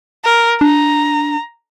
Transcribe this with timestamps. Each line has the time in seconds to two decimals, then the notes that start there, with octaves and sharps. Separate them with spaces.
0.25 A#4
0.61 D4 A#5